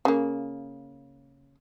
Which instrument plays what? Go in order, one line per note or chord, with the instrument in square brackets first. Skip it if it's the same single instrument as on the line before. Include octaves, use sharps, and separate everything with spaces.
[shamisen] C#3 A#3